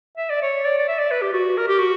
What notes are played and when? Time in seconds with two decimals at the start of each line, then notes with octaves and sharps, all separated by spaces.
0.18 E5
0.30 D5
0.42 C#5
0.65 D5
0.78 D5
0.88 E5
0.99 D5
1.11 B4
1.22 G4
1.33 F#4
1.57 A#4
1.68 G4
1.79 F#4